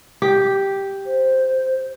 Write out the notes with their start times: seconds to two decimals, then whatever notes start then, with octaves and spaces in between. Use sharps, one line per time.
0.22 G4
1.05 C5